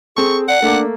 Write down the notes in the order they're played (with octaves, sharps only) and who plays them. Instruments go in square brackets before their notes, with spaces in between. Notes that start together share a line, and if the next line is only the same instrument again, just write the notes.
[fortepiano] C4 A4 [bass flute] G#4 [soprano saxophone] C#6
[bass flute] D5 [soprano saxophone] F#5
[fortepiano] A3 A#3 [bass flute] D4